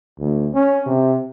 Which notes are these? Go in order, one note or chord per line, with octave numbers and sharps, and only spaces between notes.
D2
C#4
C3